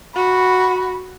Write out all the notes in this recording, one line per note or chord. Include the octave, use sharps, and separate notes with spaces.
F#4 B5